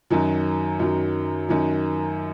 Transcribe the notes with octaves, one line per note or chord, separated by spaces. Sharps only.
F#2 D#3 F#3
F#2 D#3 F#3
F#2 D#3 F#3